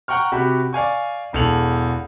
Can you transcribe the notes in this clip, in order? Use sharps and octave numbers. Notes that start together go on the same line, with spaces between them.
F#5 G5 A#5 C#6 F6
C3 F#4 G4 B5
D5 F5 G#5 C#6
E1 E2 A4 F7 F#7